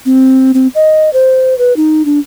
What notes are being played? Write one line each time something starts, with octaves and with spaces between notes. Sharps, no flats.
C4
C4
D#5
C5
B4
D#4
D4